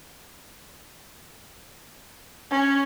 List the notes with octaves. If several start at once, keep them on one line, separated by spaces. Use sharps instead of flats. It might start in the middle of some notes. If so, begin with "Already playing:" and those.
C#4